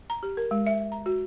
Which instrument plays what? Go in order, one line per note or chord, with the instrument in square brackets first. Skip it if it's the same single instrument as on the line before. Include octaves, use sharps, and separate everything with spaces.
[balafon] A#5
G4
A#4
G#3
E5
A#5
F#4